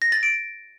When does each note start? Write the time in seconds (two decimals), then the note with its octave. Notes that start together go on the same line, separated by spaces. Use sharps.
0.02 A#6
0.12 A6
0.23 D7